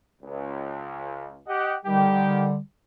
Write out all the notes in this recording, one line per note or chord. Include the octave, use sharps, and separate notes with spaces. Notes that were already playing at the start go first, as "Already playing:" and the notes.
C#2
G4 D#5 F#5
D3 D#3 G3 G4 G5